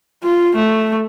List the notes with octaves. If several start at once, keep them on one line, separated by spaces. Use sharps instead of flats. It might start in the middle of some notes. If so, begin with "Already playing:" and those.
F4
A3